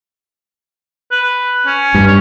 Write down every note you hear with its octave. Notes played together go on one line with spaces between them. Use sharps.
B4
C#4
G2
C#5